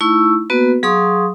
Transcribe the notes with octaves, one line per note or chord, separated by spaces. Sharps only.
A3 D#4 E4 C#6 E6
A#3 B3 F#4 B4
F#3 G#4 F5 C6 C#6 D#6